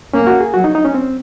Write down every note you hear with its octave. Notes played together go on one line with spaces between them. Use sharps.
A#3 C#4
F#4
G#4
F#3 F#4
D#4
D#4
C#4
C4